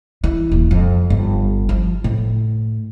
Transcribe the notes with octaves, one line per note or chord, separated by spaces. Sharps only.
E3
D#1
F2
G1
F3
A2